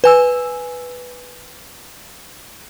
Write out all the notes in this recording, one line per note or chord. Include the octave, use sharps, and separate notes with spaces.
B4 G#5 E6